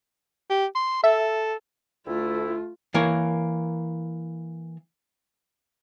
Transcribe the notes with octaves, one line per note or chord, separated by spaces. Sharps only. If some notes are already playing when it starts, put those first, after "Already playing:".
G4
C6
A4 E5
D2 A3 E4 F4
E3 A#3 A#4 C#5